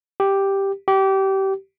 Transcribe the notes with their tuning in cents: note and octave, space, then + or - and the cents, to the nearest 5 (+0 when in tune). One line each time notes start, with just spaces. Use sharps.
G4 +0
G4 -25